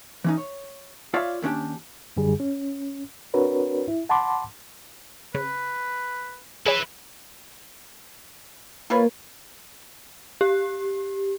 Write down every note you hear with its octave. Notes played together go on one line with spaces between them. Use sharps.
E3 C#4 D#4
C#5
F4 C#5 D5 E5 F5
D#2 D3 C#4 D4 G4
F#2 D3 G3 G#4
C#4
C4 D4 F#4 A#4 B4 C#5
E4
F#5 A5 B5 C6 D6
C#3 B4
E4 G#4 B4 C#5
A#3 F4 A#4 B4 C#5
G4